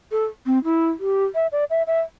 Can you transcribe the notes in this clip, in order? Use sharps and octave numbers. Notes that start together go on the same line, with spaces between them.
A4
C4
E4
G4
E5
D5
E5
E5